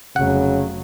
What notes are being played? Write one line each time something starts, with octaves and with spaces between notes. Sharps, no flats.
F1 C#3 F#3 F#5